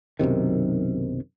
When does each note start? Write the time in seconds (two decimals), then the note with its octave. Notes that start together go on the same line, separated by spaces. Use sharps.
0.19 B1 F#2 C3 D#3